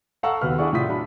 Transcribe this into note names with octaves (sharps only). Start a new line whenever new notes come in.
A4 F5 F#5 A#5 C#6 E6
D#2 B2 B4 F6
D4 E4 G#4 D5 F#5 C#6
F1 A2 F4 D#6 B6
F#3 D4 B5